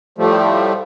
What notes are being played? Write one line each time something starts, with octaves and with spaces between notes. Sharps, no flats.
A2 F3 G3 A3